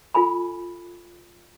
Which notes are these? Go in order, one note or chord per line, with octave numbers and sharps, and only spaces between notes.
F4 A4 G#5 B5